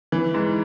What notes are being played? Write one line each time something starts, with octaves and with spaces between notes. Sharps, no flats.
E3
G#2